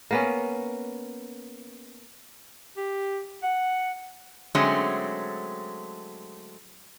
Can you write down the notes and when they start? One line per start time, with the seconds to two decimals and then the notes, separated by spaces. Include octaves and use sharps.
0.11 A#3 B3 C#4
2.77 G4
3.43 F#5
4.55 D3 F#3 G#3 A3 C4 C#4